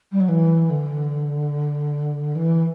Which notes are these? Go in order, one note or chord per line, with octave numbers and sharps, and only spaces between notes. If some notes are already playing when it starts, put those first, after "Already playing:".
G3
F#3
E3
D3
E3